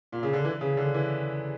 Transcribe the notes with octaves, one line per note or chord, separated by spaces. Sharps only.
A#2
C#3
D3
E3
C#3
D3
E3